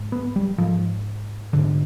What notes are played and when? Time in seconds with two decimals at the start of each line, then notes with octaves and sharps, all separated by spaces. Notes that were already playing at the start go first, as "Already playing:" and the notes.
Already playing: G#2
0.12 B3
0.36 G3
0.58 G#2 F3
1.53 G#2 D3